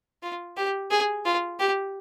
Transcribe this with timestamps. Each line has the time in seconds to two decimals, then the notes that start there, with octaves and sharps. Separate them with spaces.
0.23 F4
0.57 G4
0.91 G#4
1.25 F4
1.59 G4